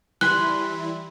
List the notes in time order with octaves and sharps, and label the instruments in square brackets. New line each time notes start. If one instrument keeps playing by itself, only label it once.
[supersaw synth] E3 G3 E4 [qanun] G#5 B5 C6 [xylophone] F#6